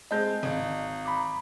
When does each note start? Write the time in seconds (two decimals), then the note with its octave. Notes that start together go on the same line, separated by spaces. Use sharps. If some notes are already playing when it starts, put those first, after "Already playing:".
0.11 G#3 C4 D#5 A5 G6
0.43 G#1
1.05 A#5 B5 D6